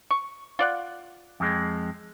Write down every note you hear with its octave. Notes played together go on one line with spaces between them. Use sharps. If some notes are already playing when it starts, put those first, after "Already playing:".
C#6
F4 D5 F#5
F2 G#3